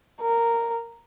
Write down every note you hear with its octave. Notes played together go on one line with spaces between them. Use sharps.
A#4